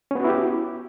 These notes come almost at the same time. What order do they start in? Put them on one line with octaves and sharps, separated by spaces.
C#4 B3 F#4 E4 G4